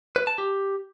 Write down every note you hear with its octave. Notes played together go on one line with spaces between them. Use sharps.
B4
A5
G4